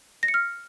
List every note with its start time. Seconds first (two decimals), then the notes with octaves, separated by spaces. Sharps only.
0.23 A#6
0.28 C#7
0.34 F6